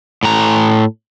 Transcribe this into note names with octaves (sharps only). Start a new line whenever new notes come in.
A2 A#5